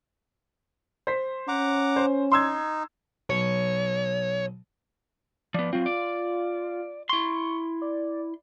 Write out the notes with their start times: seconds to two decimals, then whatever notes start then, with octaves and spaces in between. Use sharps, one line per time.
1.07 C5 B6
1.48 C#4 F#5 A#5 D6
1.96 C5
2.32 D#4 C6 E6 G#6
3.30 B1 C#5
5.54 F3 B3 D5
5.73 F#3 C4 F4
5.86 D5
7.09 E4 C6 C#6
7.82 D5